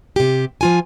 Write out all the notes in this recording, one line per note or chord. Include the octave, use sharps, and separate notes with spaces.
C3 G4
F3 F4 G#5